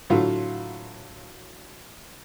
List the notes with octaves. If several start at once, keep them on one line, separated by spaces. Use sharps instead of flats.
A2 D3 F#3 F4